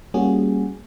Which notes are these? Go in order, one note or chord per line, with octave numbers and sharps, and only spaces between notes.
G3 A#3 C#4 F#4 G#4